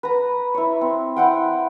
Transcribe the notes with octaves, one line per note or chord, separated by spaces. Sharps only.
B4 A#5
E4 C#5
C4
E4 F#5 G5